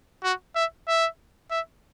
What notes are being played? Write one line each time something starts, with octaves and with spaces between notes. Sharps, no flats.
F#4
E5
E5
E5